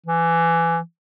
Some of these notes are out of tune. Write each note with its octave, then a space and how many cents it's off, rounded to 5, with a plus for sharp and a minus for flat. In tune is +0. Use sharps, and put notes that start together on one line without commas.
E3 +20